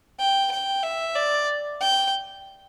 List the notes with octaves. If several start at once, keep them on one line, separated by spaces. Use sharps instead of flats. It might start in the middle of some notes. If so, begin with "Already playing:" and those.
G5
G5
E5
D5
G5